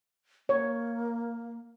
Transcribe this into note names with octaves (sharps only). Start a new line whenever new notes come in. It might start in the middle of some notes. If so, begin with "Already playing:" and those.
A#3 C#5